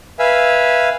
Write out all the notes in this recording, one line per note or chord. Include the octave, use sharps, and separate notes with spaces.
B4 E5 F5 G#5